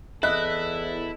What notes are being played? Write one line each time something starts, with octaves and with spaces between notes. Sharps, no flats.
E2 E4 A4 D#5 E5 F#6